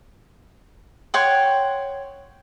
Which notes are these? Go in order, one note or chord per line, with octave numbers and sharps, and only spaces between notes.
C#5 F#5 G5 C6